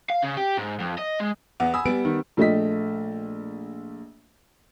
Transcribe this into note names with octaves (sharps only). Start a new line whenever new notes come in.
F5
C#3
G4
G#2
F2
D#5
G#3
E2 B3 F#5
G#5 B5 D#6 E6
G3 B3 D7
D#3
A#1 A3 D#5 B6